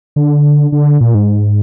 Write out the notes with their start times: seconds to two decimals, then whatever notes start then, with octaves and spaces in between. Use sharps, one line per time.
0.16 D3
0.72 D3
1.01 A#2
1.15 G#2